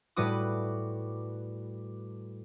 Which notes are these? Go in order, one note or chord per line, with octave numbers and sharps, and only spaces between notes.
A2 G3 F#4 B4 D6 D#6